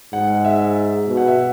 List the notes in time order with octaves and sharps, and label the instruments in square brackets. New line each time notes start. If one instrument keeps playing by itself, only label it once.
[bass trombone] G#2 [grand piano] F#5
[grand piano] E5
[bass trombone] B2
[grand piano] F#5
E5